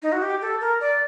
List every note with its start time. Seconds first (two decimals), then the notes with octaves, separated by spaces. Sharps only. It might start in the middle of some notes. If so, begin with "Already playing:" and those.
0.03 D#4
0.12 F#4
0.22 G4
0.42 A4
0.61 A#4
0.81 D5